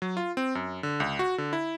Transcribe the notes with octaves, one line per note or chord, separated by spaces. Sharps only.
F#3
F4
C4
F#2
D3
C#2
F#4
D3
E4